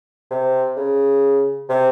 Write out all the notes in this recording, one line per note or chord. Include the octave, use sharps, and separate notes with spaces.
C3
C#3
C3